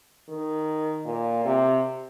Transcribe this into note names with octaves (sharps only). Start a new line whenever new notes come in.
D#3
A#2
C3